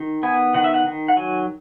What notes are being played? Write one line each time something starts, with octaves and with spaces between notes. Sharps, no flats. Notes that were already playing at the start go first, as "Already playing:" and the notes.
Already playing: D#3
B3 G#5
D#3 F#5
E5
F#5
D#3
F#5
F#3 G#5